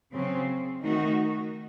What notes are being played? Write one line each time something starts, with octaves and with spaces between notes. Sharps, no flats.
C#3 F#3 C4
D#3 A3 D#4 F#4